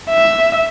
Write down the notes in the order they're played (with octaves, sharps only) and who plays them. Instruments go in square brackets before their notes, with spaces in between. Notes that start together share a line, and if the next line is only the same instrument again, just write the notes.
[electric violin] E5